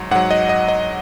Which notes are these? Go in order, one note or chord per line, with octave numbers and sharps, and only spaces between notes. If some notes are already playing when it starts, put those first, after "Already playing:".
Already playing: G#2 F#3
G#2 F#3 F#5
D#5
D#5
D#5